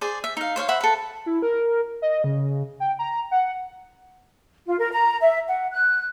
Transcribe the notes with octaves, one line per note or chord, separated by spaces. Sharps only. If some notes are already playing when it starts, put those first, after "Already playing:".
G#4 C5 D5
E5
D#4 F5
C5 C#5 E5 F5
C5 E5 F#5 B5
A4 B4
E4
A#4
D#5
C#3
G5
A#5
F#5
F4
A#4
A#5
E5
F#5
F#6